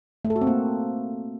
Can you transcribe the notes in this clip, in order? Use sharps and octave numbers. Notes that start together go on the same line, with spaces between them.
A3
A4
F#4
C4
A#3